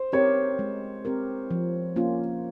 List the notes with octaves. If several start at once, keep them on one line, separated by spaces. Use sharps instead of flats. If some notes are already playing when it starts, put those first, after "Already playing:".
Already playing: C5
C4 G4 A#4 C#5
G#3
C4 G4 A#4
F3
A#3 C#4 F4